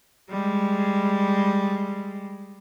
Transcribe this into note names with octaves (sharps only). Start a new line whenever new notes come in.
G3 G#3